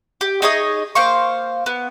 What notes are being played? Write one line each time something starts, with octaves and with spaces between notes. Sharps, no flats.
G4
D#4 G#4 C#5 D#5
A#3 C5 F5 C#6
B3